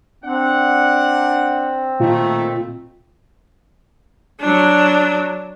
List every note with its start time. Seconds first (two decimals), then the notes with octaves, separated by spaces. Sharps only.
0.24 C4 D4 F#5
2.00 A#2 D#3 A3 F4
4.40 F#3 D4